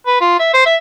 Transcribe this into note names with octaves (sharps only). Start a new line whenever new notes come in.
B4
F4
E5
C5
E5